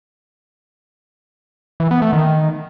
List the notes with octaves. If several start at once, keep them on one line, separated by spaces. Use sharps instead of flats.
E3
B3
A3
D#3